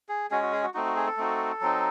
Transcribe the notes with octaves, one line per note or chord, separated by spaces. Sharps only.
G#4
G#3 C#4 F#4 G#4
F#4
G#4
F#4
A3 C4 D#4 F#4
F#4
G#4
A4
A3 C4 D#4 F#4
F#3 C4 D#4